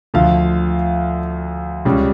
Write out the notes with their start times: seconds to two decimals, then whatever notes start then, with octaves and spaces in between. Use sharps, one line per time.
0.14 D2 D3 F3 F5
1.85 C#2 C#3 G3